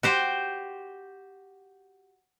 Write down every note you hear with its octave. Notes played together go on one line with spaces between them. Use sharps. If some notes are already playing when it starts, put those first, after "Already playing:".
F#4 G4 C5